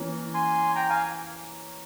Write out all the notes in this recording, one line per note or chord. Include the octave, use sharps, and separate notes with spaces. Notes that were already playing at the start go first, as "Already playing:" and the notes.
Already playing: E3 A#3 C#4
G#5 C6
G5 A#5
F5 G#5